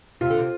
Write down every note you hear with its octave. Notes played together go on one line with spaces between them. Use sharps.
C3 F4
D3
C3